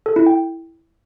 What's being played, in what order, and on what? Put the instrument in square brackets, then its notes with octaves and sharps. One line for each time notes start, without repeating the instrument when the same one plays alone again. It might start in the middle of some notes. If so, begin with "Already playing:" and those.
[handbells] A4
E4
G5